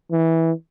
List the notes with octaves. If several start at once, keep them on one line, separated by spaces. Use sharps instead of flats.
E3